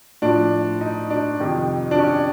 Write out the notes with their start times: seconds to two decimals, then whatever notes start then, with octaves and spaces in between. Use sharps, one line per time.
0.22 A2 F3 D4
0.81 D#4
1.10 D4
1.40 F2 C3 D#3
1.91 D4
1.98 C#4